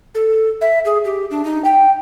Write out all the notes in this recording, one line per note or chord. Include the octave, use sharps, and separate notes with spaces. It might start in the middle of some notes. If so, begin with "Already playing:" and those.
A4
E5
G#4
G4
D4
D#4
G5